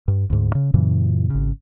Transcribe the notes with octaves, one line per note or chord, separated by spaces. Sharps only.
G2
D2 G#2
C#3
F#2 A#2 C#3 E3
G#1 C#3